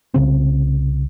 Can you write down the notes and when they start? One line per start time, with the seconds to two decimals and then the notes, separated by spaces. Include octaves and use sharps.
0.14 C2 C#3 C4